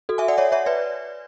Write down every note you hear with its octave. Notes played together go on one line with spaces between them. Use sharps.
F#4 A4
E5 G#5
D5 F#5
C#5 E5
C#5 E5
B4 D5